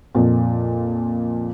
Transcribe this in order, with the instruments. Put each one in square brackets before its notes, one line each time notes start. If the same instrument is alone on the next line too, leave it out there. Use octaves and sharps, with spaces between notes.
[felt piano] F2 A#2